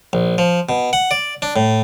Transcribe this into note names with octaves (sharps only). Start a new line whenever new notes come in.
A#1
F3
B2
F#5
D5
D4
A2